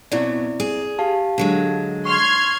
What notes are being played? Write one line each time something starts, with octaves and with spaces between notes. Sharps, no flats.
B2 F#3 C4 E4 D5
G#4
G4 F5 A5
D3 F#3 G#3
C6 C#6 F6 G#6